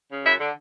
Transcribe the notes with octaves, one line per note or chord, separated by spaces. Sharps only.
C#3
F#2 E5
D3